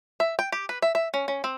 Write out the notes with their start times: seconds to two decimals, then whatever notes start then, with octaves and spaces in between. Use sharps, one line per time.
0.20 E5
0.39 G5
0.52 G4
0.69 B4
0.82 E5
0.95 E5
1.14 C#4
1.28 C#4
1.44 C4